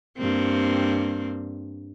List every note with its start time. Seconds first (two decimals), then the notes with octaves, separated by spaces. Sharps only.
0.18 G2 A#3 C4